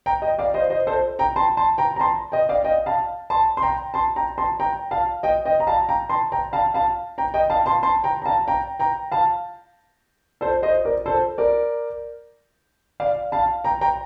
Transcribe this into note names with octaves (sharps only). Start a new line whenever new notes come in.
G5 A#5
D#5 G5
D5 F5
C5 D#5
C5 D#5
A4 C5
G5 A#5
A5 C6
A5 C6
G5 A#5
A#5
A5 C6
D#5 G5
D5 F5
D#5 G5
F5 A5
A5 C6
C6
G5 A#5
A5 C6
G5 A#5
A5 C6
G5 A#5
F5 A5
D#5 G5
D#5 G5
A#5
F5 A5
G5 A#5
A5 C6
G5 A#5
F5 A5
F5 A5
G5 A#5
D#5 G5
F5 A5
A5 C6
A5 C6
G5 A#5
A#5
F5 A5
G5 A#5
G5 A#5
F5 A5
A4 C5
C5 D#5
A#4 D5
A4 C5
A#4 D5
D5 F5
F5 A5
G5 A#5
G5 A#5